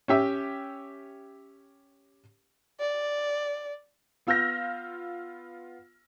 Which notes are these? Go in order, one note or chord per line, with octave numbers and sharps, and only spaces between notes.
C#4 G4 E5
D5
B3 F4 E6 F6 G6 A#6